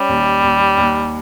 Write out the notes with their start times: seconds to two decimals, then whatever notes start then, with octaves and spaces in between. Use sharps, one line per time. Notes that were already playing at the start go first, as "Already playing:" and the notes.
Already playing: G3 C#4
0.09 D#2
0.43 D#2
0.78 D#2